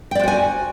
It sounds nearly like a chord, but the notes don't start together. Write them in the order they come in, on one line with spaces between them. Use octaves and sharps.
G5 D5 C5 F#4 G#5